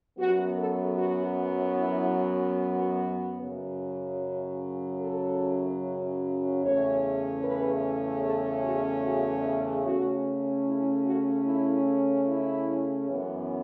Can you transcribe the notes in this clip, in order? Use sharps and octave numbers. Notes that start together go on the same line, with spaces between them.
F#2 F#3 B3 F#4
A4
F#4
E4
F#4
F#2 C#3 F#3
A4
E2 C#3 A3 C#4 C#5
B4
A4
F#4
F#4
C#3 A3 C#4 F#4
E4
F#4
E4
E4
F#2 E3 B3